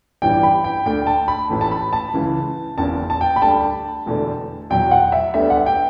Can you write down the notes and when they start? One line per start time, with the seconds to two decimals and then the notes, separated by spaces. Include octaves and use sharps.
0.22 A1 G2 E3 G3 G5
0.43 B5
0.64 G5
0.86 D2 D3 A3 G5
1.07 A5
1.28 B5
1.49 A1 A2 E3 A3
1.61 A5
1.71 B5
1.93 A5
2.14 C#2 C#3 E3
2.77 F#1 E2 C#3 A5
3.10 A5
3.21 G5
3.36 B5
3.41 D2 D3 G3 A5
4.06 E1 E2 D3 A3
4.70 E2 B2 F#3 G5
4.91 F#5
5.12 E5
5.34 D2 D3 G3 B3 E5
5.50 F#5
5.66 G5